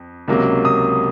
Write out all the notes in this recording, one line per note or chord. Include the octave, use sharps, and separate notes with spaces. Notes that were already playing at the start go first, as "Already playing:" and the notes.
Already playing: F2
C#2 C3 F#3 A#3
D#6